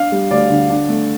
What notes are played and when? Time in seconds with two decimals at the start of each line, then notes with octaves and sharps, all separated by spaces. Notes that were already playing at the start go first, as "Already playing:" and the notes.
Already playing: D4 F5
0.12 G3
0.31 D2 D5
0.50 D3
0.69 D4
0.89 A3